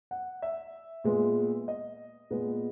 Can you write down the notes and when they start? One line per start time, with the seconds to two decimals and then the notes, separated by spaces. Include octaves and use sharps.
0.11 F#5
0.42 E5
1.04 A#2 G#3 B3
1.68 D#5
2.30 A#2 G#3 B3